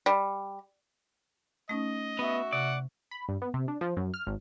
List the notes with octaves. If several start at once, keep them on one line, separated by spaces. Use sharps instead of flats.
G3
A3 C#4 D#4 D#5
B3 F#4 E5
C3 D5 F#5
B5
G2
B3
C3
D4
F3
F#2
F6
G#1